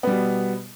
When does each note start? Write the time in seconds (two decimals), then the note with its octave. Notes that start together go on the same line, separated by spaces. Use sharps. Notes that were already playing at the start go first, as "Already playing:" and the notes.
0.03 B3
0.07 G3
0.11 B2